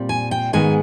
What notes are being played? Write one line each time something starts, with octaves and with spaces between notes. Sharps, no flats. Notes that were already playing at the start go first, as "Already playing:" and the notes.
Already playing: A#2 G3 C4
G#5
G5
G#2 D#3 G#3 B3 G#5